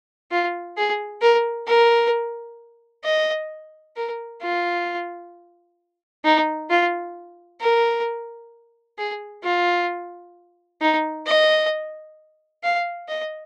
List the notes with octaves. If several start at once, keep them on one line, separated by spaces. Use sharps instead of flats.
F4
G#4
A#4
A#4
D#5
A#4
F4
D#4
F4
A#4
G#4
F4
D#4
D#5
F5
D#5